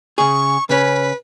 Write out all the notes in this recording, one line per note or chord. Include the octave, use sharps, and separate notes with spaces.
C#3 G#4 C#6
C#3 C#4 B4